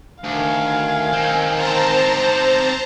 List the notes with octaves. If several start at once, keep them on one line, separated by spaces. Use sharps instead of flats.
D2 D#3 F5 G#5
C4 D#4
C5 A5 A#5